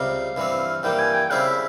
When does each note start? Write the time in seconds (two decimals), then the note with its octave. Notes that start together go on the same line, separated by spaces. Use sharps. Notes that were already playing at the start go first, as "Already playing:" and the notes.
Already playing: C#2 C3 G3 F5
0.36 G2 E3 G3 C4
0.83 G2 E3 G3 A#3 G5
0.99 G#5
1.14 G5
1.30 C#3 G3 C4 E4 F5
1.46 E5